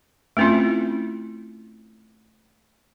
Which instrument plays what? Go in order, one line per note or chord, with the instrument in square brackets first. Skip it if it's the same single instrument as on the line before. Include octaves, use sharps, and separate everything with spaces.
[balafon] A3 C4 C#4 E4 F4